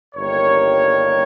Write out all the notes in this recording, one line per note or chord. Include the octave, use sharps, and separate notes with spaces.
G1 G2 D#3 G3 A#3 A#4 C#5